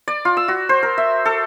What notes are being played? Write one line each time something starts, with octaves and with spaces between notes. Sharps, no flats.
D5
F4
E6
F#4
C5
A#4
E5
A4